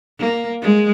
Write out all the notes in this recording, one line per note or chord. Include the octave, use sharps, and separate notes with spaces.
A#3
G#3